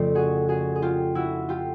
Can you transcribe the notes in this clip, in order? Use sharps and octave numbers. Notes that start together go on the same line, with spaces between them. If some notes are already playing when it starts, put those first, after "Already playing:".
Already playing: F2 C#3 F3 A3 C4 C5 D5
F#4 G#4
F#4 G#4
G#4
F4 G4
E4 F#4
F4 G4